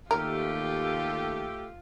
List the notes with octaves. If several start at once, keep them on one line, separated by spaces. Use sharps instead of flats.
D#2 A3 F4 G4 A#4